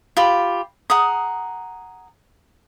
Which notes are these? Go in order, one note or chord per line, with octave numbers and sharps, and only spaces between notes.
F4 G4 B5
G#4 F#5 A#5 D#6